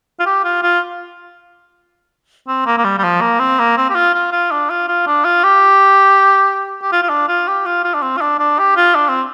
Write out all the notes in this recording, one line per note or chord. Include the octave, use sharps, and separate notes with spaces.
F4
G4
F4
F4
C4
A#3
A#3
G3
G3
F3
A#3
C4
A#3
C4
G4
F4
F4
F4
D4
F4
F4
D4
F4
G4
G4
F4
F4
D4
F4
G4
F4
F4
D4
C4
F4
D4
D4
G4
F4
D4
C4